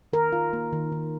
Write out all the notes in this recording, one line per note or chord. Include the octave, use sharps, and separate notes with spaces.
D#3 A#4
F4
A#3
D#3
D#3